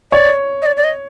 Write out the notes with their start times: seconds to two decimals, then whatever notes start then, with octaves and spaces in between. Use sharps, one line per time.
0.12 C#5 D5
0.62 D#5
0.66 D5
0.77 D5
0.84 D#5